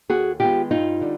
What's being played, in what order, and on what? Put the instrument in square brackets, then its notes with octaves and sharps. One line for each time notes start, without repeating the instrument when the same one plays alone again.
[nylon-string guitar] D#2 F#4 G#4
D#3 G#3 B3 F4 G4
G2 D#4 F4
D3 G3